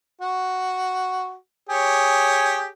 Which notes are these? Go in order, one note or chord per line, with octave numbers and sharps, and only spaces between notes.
F#4
G4 G#4 C#5